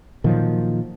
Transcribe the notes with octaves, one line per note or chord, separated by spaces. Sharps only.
A#2 D#3 F3 F#3